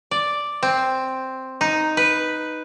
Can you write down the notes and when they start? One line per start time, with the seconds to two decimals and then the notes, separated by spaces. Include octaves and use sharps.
0.11 D5
0.63 C4
1.61 D#4
1.97 B4